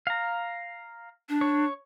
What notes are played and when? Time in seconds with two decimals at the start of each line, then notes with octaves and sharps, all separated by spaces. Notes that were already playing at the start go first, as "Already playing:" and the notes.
0.07 F5 A#5
1.29 D4
1.41 C#5